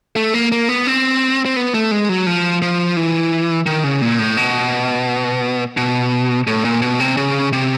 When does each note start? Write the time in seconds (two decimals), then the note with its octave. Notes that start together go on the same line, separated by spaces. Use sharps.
0.16 A3
0.34 A#3
0.52 A#3
0.69 B3
0.87 C4
1.45 C4
1.56 B3
1.74 A3
1.91 G#3
2.09 F#3
2.27 F3
2.62 F3
2.97 E3
3.66 D#3
3.84 C#3
4.01 A#2
4.19 A2
4.37 B2
5.77 B2
6.47 A2
6.65 A#2
6.82 B2
7.00 C3
7.17 C#3
7.53 C3